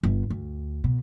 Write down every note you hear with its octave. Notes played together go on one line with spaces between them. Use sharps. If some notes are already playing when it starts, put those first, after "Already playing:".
G1
D2
B2